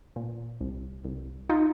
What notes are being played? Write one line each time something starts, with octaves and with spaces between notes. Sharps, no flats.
A#2
C2
C2
D#4 F4